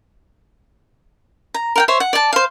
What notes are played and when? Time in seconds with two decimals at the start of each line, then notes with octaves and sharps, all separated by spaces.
1.54 A#5
1.76 A#4 F#5 G5
1.88 C5 C#5 E5
2.00 F#5
2.13 D5 A5
2.33 C5 F5